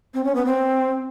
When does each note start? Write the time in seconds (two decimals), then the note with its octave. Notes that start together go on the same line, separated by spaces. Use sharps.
0.14 C4
0.24 C#4
0.35 B3
0.46 C4